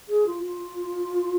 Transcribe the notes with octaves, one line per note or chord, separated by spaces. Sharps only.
G#4
F4
F4